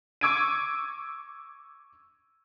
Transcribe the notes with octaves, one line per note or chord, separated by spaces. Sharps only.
C#6 D6 E6 G#6 D7 D#7